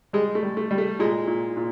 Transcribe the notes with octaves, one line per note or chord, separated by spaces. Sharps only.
G3 G#3
A3
G3
A3
G3
A3
A#2 G#3
A#2
A#2